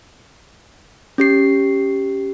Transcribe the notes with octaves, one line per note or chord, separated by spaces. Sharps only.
C#4 G4 C7